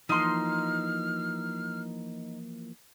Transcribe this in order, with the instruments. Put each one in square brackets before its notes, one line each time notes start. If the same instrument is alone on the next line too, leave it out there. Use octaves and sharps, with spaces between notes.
[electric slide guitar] E3 F3 A#3 [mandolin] D#4 C6 [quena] F6